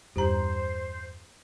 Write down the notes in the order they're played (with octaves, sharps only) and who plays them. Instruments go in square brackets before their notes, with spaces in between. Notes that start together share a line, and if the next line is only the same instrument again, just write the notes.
[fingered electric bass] E2 G2 E3 [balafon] G4 A#5 [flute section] C5